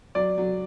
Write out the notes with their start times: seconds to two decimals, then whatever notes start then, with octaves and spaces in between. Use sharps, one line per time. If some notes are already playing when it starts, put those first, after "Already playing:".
0.15 F#3 D5
0.38 F#3